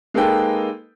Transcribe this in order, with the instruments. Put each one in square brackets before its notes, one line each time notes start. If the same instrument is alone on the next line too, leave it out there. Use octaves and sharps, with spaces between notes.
[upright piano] G#3 A#3 D#4 A4 B4 G5